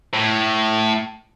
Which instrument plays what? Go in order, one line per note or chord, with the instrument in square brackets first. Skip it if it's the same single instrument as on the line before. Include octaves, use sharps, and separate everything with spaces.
[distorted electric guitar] A2